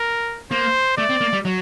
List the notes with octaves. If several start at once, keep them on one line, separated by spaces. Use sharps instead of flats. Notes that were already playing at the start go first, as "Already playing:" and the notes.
Already playing: A#4
A#3 C5
A3 D5
C4
A#3
G3
F#3